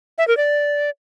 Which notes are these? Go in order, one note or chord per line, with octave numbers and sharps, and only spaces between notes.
E5
A#4
D5